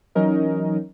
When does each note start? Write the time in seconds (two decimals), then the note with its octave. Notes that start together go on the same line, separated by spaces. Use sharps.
0.15 E3 F#3 C#4 D#4 A#4 D#5